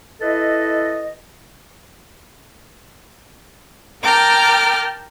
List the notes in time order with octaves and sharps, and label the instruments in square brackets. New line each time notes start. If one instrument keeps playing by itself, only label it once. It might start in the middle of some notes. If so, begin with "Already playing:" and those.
[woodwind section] E4 A4 B4 D#5
[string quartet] A#4 G5 A5 A#5 D6 F6